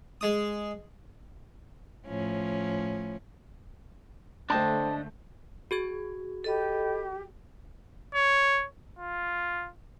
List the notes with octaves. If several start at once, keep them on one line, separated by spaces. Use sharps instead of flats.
G#3 D#6
A2 F3 C#4
D3 A3 D4 C5 D#5 G5 A5 G6
F#4 G#4 G#6
G4 A4 D#5 B5
C#5
F4